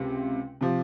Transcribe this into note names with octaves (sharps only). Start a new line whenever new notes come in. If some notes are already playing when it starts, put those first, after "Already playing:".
Already playing: C#2 C3
C3 F3